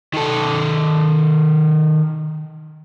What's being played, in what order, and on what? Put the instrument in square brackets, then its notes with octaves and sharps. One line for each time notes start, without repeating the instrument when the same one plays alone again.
[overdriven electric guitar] D#3 A4